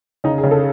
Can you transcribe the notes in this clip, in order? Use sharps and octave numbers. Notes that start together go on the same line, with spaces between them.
C#3 D#4
G#4
C#3
A4